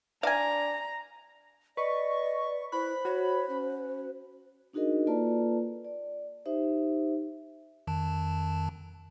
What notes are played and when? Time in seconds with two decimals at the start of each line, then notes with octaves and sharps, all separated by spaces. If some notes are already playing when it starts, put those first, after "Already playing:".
0.23 D4 F5 G#5 A#5
1.77 B4 D5 D#5 C#6
2.72 E4 C5 B5 F#6
3.05 F#4 C#5
3.49 C#4
4.73 D4 D#4 F#4 G#4 A#4 D#5
5.07 A#3 F4 A4 B4 D5 A5
5.85 D5
6.46 D#4 G4 C5 E5
7.87 F2 D#3 A5